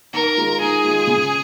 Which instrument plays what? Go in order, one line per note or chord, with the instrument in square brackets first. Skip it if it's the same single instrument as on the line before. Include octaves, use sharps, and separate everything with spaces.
[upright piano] D#3 [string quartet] A#4
[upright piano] G#3 F4
[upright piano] D#3 [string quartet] G#4
[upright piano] G#3 F4
C#3